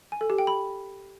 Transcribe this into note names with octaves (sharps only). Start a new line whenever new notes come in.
G#5
A4
G4
G5
B5